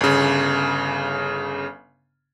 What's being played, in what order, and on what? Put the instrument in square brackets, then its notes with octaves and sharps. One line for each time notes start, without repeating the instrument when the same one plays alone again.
[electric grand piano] G1 C#3